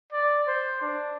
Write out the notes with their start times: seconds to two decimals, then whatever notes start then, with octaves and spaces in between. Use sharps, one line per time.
0.12 D5
0.47 C5
0.82 D4